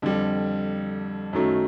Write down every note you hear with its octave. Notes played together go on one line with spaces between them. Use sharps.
F2 D3 G3
F#2 D#3 F#3 A3